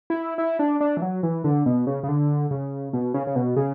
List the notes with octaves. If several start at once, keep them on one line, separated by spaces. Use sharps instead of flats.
E4
E4
D4
D4
E3
F#3
E3
D3
B2
C#3
C#3
D3
C#3
B2
C#3
C#3
B2
C#3